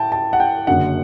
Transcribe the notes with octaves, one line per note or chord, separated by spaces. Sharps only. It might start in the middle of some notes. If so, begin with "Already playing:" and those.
Already playing: A2 G5 A5
A5
F#5
G5
F#1 F#2 D3 F#5